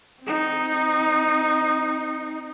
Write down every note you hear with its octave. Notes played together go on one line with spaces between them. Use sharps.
C4 D#4